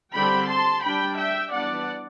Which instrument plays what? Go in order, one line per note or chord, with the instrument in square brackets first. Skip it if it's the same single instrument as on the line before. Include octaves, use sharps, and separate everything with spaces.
[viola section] D3 G3 C4 G5 B5
A5 C6
G3 D4 G5 B5
E5 G5
E3 G3 B3 D4 D5 F#5